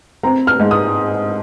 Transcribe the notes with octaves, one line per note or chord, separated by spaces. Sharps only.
C4 A#5
F6
G#2
D#6